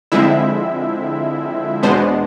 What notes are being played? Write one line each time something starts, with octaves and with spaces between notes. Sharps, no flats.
D3 F3 G#3 C4 E4 E5
E2 B2 G#3 B3 D4 C5